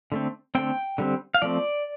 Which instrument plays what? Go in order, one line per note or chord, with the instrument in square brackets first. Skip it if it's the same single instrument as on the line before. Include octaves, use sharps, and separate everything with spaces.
[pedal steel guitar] D3 A3 C4
D3 A3 C4 G5
D3 G3 C4
F5
F3 A3 C4 D5